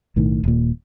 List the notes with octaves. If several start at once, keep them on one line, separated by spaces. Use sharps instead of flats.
B1 A2 D#3
D#1 A#2